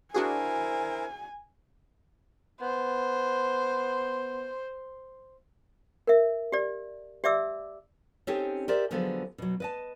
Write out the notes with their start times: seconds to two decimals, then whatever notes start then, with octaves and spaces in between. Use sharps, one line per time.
0.14 D4 E4 F#4 G#4 A#4 C5 G#5
2.61 B3 C5
6.07 A#4 E5
6.52 G4 D5
7.24 G4 D5 E5 D6 E6
8.27 C4 C#4 D#4 G4 A4 C#5
8.68 G4 A#4 C5 D5 E5
8.91 D3 F3 F#3 G#3 B3 A4
9.38 B2 F#3
9.60 B4 D#5 A5